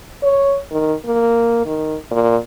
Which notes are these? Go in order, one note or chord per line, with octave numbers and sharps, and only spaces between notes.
C#5
D#3
A#3
D#3
A#2